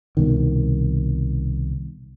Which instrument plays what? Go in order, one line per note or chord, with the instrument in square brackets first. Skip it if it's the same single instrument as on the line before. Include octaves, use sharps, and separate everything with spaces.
[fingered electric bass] C2 B2 D#3